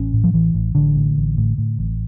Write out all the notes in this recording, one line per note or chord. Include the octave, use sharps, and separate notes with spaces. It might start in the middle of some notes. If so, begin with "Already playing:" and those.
Already playing: A1 C#4
A2
F3
A1 E3
A1
A1 D3
A2
A1
A2
A2
A1